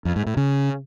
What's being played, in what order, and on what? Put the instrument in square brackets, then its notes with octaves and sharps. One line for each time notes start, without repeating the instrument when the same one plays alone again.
[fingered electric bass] F2
G#2
A2
C#3